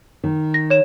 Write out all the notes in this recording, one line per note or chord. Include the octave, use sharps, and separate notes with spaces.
D#3
A#6
C#5 E7